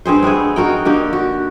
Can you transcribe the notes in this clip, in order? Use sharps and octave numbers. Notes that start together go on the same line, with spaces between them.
G2 C4 G#4 C5
G#3 A3 B3 G#4
D#4 F#4 A#4 G5
D3 A#3 D#4 G4
F#4